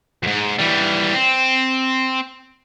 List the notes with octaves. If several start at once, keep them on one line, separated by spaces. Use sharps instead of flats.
F2 G#2
E3 G3
C4